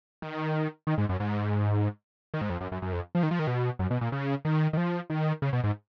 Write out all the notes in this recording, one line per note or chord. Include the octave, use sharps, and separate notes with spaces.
D#3
D#3
G#2
F#2
G#2
D#3
G#2
F2
F#2
F#2
F#2
F2
F3
D#3
F3
D#3
B2
F#2
B2
A#2
C#3
D#3
D#3
F3
D#3
C#3
B2
G#2